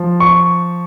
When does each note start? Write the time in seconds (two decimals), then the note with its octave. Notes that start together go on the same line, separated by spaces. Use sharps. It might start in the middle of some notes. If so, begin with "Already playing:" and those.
Already playing: F3
0.20 C#6